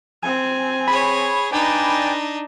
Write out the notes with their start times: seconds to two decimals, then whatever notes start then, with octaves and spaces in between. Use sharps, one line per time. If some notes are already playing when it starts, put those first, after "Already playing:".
0.23 C4 G#5
0.88 G#4 C#5 B5
1.52 D4 D#4 B4 D5 G5 G#5